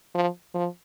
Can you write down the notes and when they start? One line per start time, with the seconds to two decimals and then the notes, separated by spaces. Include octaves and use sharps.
0.15 F3
0.54 F3